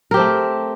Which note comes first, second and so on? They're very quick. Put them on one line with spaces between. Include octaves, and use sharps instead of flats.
A#4 G4 C4 A3